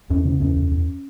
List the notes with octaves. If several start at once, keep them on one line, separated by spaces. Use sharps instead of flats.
E2 C#4
C#3 C#4
E2 C#4
E2
E2